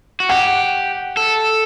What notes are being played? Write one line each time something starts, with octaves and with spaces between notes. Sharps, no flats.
F#4
G4 F#5
A4